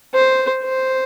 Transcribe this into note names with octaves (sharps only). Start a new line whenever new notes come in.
C5
C5